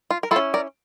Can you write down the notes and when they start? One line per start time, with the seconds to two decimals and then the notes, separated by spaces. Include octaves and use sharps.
0.10 F4
0.23 A#4
0.31 E4 F4 A4
0.36 C#4
0.54 A#4 D5